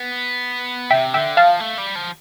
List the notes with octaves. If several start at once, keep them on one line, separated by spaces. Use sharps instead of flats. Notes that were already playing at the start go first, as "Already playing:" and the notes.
Already playing: B3
C3 E5 G5
D3 E5 G5
F3 F5 A5
A3
G3
F3